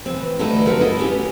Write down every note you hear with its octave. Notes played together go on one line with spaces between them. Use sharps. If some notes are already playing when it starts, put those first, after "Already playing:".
E3 C4
D3 E3 G3 A3 D#4 E4
F#2 C4 A#4 B4 F#5 A5
A3 E4 A4 D#5
B3 C#4 G4